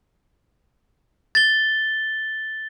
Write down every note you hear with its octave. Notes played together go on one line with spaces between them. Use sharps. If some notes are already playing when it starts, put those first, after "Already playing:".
A6 G7